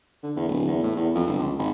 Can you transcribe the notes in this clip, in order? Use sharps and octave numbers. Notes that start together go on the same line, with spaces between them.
D3
E2
D1
E2
A2
E2
F2
G1
C#2
G#1